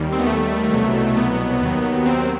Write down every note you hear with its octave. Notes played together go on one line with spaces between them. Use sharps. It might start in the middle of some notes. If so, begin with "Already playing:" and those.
Already playing: D#2 D#3 G3
C4
B3
A3
C2 B2 F#3
B3
D#2 D#3 F#3
C4